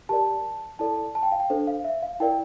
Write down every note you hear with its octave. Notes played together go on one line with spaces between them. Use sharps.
G4 A#4 D5 A5
E4 A4 D5 A5
A5
G5
F5
G5
D4 A4 C5
F5
E5
F5
E4 A#4 D5 G5